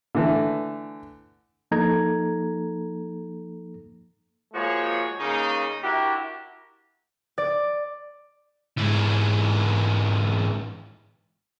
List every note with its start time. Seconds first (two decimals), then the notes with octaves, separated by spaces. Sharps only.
0.15 D3 E3 A3
1.71 F3 A#3 D#4 A4 A#5 G#6
4.54 F3 G#3 A#3 F#4 C#5
5.20 C#3 A#3 D#4
5.83 D4 E4 F#4 G4 A#4
7.38 D5
8.78 G#2 E3